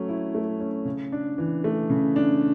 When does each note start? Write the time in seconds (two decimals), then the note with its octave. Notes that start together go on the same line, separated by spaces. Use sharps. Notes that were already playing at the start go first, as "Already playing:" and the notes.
Already playing: F#3 A3 C#4
0.09 E4
0.35 A3
0.60 C#4
0.85 C#3
1.12 D4
1.38 E3
1.64 A3
1.90 C#3
2.16 D4